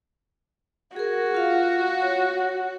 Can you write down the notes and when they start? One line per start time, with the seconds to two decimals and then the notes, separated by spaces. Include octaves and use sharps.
0.96 F#4 G#4 A#4
1.34 F4 F5
2.02 C#5